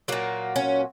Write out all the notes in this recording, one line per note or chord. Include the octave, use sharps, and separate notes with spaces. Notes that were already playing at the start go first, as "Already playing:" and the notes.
A#2 F#3 A#3
C#4